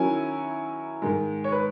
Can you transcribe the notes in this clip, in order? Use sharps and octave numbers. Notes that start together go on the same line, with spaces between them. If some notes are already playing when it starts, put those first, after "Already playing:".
Already playing: D#3 F#3 C#4 E4 G#5
G#2 D#3 G#3
C#5
B4